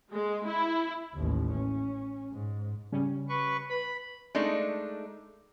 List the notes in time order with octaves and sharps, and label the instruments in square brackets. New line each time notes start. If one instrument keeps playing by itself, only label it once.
[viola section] G#3
E4
[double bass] A1 D#2
C#4
G#2
[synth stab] C#3 G3 C#4
[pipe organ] B4 C#6
[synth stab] B4 [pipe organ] B5
[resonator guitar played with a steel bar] G#3 A3 D4 D#4